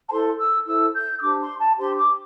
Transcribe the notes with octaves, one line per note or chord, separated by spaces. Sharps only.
A5
E4 A4 C5 C6
E6
E4 A4 C5 E6
G6
E6
D4 G4 C5 D6
C6
A5
D4 G4 C5 C6
D6